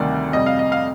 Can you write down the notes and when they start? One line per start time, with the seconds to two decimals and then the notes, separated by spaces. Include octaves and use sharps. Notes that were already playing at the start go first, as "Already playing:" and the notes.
Already playing: D2 C3 D#3 G3 D5
0.33 F2 C3 G3 D#5
0.46 F5
0.59 D#5
0.72 F5